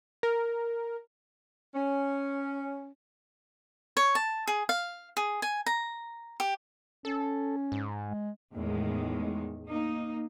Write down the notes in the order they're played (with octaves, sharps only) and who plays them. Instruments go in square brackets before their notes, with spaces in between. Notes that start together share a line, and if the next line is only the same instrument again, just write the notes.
[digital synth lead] A#4
[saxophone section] C#4
[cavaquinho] C#5
A5
G#4
F5
G#4
G#5
A#5
G4
[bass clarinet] C#4 [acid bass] A4
[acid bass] G#2
[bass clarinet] G#3
[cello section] E2 A2 D#3 G#3
A#3 D#4